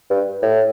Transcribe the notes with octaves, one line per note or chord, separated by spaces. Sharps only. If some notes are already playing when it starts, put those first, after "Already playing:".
G2
A2